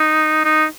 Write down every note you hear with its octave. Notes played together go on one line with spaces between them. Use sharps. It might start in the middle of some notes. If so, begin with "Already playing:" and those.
Already playing: D#4
D#4